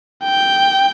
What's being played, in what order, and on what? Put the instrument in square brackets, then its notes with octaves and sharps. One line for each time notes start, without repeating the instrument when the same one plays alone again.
[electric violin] G5